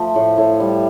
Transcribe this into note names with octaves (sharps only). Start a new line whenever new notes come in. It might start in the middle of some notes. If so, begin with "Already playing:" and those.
Already playing: F3 A3
A2
A2
G3